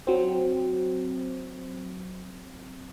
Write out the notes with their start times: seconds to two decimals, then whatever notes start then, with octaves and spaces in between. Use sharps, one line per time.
0.07 F#3 C4